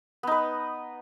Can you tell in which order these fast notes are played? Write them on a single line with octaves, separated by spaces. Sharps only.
B3 D#4 B4